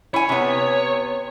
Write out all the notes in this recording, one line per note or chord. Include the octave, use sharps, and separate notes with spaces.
E4 C#5 G#5
C3 B3